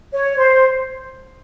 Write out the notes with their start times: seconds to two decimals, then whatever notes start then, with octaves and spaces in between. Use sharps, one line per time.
0.12 C#5
0.37 C5